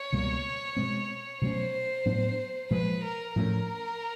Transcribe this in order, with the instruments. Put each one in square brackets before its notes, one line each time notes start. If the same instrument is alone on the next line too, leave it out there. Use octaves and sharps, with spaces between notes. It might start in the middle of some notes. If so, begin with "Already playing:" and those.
Already playing: [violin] C#5
[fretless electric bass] C#2 B2 G3 A#3
B2 G#3 C4
[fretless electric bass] B2 F#3 A3 C#4 [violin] C5
[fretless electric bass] A2 F#3 B3 D4
[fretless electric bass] A#2 F3 G#3 [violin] B4
[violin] A#4
[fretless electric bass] A2 F3 A3 C#4 [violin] A#4